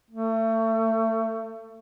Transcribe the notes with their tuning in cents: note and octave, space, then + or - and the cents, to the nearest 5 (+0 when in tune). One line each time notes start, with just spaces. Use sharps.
A3 +30